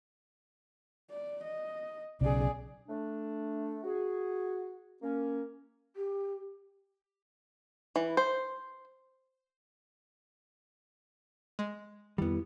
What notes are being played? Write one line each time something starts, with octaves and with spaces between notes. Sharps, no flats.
D5
D#5
B1 C#3 G#4 D5
A3 D4
F#4 G#4
A#3 C#4
G4
E3
C5
G#3
F2 D#3 G3 B3 E4